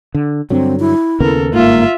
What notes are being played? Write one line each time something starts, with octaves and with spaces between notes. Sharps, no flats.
D3
G2 D3 F#3 C4
E4
D#2 C#3 B3 A4 A#4
G1 G#2 A#3 F4 E5